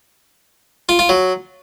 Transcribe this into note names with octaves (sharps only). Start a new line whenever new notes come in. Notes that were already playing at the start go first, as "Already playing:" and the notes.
F4
F4
F#3